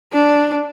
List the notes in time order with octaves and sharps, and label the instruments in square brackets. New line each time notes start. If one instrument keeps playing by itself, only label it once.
[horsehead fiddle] D4